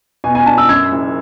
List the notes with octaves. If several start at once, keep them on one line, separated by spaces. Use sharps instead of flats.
B2 G#5
G#5
D4 A5
E6
F#2 G#6
F#1